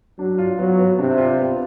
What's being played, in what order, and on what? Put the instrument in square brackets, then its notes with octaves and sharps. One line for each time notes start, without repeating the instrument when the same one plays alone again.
[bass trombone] F#3 [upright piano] D4
[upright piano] F4
[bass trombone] F#3 [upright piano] B3
[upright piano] B3
[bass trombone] C3 [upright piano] D4
[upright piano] F4
B3